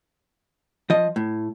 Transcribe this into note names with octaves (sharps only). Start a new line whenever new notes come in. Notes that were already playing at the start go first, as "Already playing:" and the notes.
F3 D#5
A2